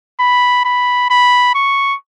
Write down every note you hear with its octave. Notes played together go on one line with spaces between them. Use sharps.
B5
B5
B5
C#6